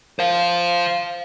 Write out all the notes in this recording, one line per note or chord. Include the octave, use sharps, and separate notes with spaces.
C5 F5